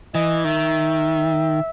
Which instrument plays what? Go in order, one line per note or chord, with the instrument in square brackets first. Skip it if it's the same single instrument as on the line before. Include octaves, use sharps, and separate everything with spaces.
[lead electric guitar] E3 [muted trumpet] D#5
[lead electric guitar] D#3 [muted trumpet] E5